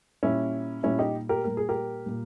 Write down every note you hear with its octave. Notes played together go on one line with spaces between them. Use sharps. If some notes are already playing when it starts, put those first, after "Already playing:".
A#2 G3 C#4 E4
A#2 G3 C#4 E4
D#4 G4
G4 A#4
A#2 G3 A#4
G#4
G4 A#4
A#2 G3